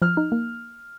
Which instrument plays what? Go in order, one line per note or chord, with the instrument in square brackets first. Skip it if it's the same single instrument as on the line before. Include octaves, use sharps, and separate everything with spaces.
[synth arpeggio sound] F3 [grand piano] F6
[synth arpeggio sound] D#4
A#3